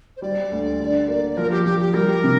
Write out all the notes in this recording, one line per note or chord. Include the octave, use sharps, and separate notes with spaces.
C5
G3 D5
D2
D3
A#3
F3 A#4
G4
F3 G4
G4
G3 A#4
C3